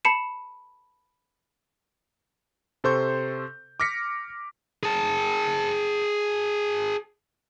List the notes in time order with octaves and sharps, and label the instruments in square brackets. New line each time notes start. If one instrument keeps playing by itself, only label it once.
[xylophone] A5 B5 C7 C#7 E7
[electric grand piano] C3 A4 C5 C6 C#6 G6
D6 F6 A#6 B6 C#7
[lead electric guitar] G#4 A5